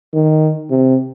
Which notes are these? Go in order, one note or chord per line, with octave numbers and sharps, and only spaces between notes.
D#3
C3